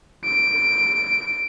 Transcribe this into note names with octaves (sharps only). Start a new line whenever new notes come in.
D7